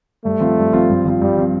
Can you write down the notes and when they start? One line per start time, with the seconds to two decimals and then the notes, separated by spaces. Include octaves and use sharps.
0.24 G2 A3
0.40 F3 C4 F4
0.57 G2
0.73 F3 C4 F4
0.89 G2
1.05 F3 C4 F4
1.21 G2 G3
1.37 F3 C4 F4